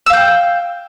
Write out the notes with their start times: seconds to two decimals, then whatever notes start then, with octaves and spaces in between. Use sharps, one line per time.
0.06 E6
0.10 F5
0.13 G6
0.17 G5